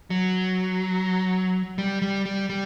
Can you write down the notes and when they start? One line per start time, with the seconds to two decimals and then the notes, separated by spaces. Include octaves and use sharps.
0.10 F#3
1.78 G3
2.02 G3
2.25 G3
2.49 G3